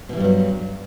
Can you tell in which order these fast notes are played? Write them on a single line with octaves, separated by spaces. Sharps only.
B2 E3 G3 G2 F#3